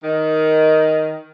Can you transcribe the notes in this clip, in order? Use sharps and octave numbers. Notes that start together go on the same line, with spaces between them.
D#3